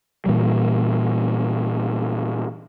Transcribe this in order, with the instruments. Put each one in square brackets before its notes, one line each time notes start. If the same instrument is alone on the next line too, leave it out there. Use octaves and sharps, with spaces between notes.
[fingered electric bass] A#2 E3 G3